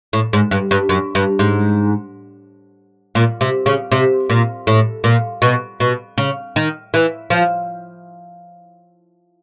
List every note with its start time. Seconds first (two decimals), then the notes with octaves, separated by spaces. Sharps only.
0.13 A2
0.33 G#2
0.51 G2
0.71 G2
0.89 F#2
1.15 G2
1.39 G#2
3.15 A#2
3.41 C3
3.66 C#3
3.92 C3
4.30 A#2
4.67 A2
5.04 A#2
5.42 B2
5.80 B2
6.18 C#3
6.56 D#3
6.94 E3
7.30 F3